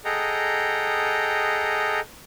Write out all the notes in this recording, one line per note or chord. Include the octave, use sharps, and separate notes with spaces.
G#4 A4 D#5 F#5 G5 A#5